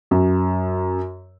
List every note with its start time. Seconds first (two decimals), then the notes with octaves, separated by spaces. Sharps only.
0.11 F#2